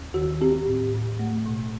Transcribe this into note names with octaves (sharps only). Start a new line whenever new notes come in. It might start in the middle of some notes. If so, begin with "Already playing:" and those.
Already playing: D#2
D#3 F#4
C4 G4
A2
A2
A3
B2